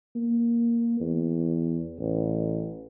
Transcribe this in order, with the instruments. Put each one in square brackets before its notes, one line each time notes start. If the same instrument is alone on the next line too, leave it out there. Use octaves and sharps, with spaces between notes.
[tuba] A#3
E2
A1